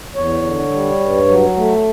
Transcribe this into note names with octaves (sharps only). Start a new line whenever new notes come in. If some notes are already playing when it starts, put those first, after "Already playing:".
E2 C#5
D3
G3
G2
F#3
A3